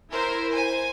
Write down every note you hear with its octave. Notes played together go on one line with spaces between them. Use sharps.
E4 A#4 C5
C5 G#5